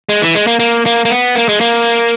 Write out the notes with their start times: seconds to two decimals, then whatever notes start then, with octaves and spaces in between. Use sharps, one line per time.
0.09 G#3
0.22 E3
0.35 G#3
0.47 A#3
0.59 A#3
0.86 A#3
1.05 A#3
1.10 B3
1.36 A#3
1.49 G#3
1.61 A#3